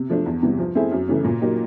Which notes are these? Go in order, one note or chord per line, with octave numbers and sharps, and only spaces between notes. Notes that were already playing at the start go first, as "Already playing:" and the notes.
Already playing: C3
F3 A3 D4
E2
C3 E3 G3
F3
A3 C4 E4 G#4
F#2
C#3 E3 A3
A#2
F#3 A#3 D#4 G4